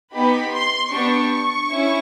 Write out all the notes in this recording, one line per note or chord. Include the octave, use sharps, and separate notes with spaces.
B3 D#4 G4 B5
C6
B3 D4 G4 C#6
C#4 E4